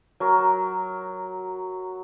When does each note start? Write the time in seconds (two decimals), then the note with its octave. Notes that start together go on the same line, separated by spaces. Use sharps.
0.20 F#3 A#4